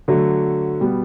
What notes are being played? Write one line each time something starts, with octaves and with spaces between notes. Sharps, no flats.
D3 F#3 A3
B2 G3 B3